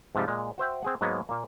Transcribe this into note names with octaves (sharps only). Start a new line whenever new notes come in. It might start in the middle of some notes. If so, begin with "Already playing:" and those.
G#2 C3 F3 G3
A#2 G#3
F#4 C5 E5 G5
C4 G#4 F#5
G#2 F#3 G#3 A#3 B3 G#5
A#2 A#3